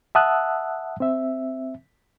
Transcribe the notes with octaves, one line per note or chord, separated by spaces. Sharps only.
E5 F#5 A5 D#6 E6 F#6
C4 E5